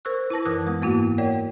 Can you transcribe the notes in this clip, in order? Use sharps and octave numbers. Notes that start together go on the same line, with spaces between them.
A#4 C5 C#6 E6 F#6
E4 B4 A5 A#6
F#2 E3 A#4 D6 D#6 F#6
G#3 B3
G#2 A#3 E4 F#4
A#4 C#5 D5 F#5 G5